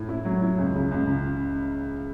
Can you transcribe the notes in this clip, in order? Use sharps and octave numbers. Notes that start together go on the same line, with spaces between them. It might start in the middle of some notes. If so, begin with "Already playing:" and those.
Already playing: A2
E4
F#3
E4
C#2
C#3
C#2
C#3